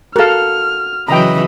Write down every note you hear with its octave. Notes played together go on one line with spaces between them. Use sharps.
F#4 A4 A#4 F5 F6
C#3 E3 F#3 D#5 G5 A#5 B5